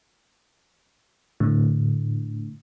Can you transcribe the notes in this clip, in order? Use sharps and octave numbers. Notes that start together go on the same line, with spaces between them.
A2 D3